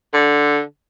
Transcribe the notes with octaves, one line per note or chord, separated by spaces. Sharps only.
D3